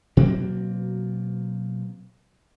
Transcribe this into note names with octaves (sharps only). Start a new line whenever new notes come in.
B2 F#3 A#3 C4